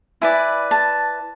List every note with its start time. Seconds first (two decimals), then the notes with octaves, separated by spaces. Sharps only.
0.22 E4 B4 D5 G#5
0.71 A5